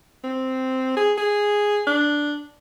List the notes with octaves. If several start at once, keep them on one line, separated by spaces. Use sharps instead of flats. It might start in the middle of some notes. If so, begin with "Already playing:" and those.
C4
G#4
G#4
D4